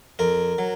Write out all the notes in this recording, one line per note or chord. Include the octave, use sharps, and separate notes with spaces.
F2 A#4
F#3